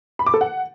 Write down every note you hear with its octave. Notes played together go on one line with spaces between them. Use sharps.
B5
D6
A4
F#5